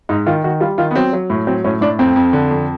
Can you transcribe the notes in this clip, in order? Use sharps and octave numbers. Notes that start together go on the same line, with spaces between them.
G#2 D#4
D#3 F4
D#3 F#4
G3 F4
D#3 F4
B3
F#3 C4
F#3
A2
F#3 C4
A2 C#4
A2 D4
F2 C4
F2
D3
F2